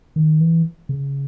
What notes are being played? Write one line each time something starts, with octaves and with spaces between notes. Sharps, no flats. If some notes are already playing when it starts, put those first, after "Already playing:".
D#3
E3
C#3